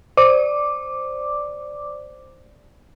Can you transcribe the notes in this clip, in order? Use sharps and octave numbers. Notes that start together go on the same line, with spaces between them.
C5 D5 D6